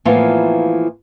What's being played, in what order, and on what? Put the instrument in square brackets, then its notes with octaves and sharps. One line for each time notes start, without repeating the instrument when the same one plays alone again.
[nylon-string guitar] A2 E3 F3 A#3 B3 F4